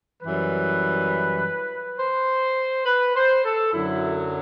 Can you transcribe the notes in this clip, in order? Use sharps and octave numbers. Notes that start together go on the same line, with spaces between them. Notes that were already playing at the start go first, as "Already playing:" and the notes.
F#2 E3 G3 B4
C5
B4
C5
A4
F#2 D3 F#3 E4